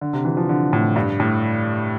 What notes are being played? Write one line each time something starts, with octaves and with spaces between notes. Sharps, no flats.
D3
C3
E3
F3
D3
A2
G2
A2